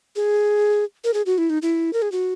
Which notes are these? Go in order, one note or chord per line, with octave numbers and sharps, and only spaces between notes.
G#4
A#4
G#4
F#4
E4
D#4
E4
A#4
G#4
F#4